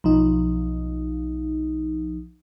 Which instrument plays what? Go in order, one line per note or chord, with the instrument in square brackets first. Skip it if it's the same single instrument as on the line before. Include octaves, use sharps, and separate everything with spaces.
[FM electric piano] B1 F3 D#4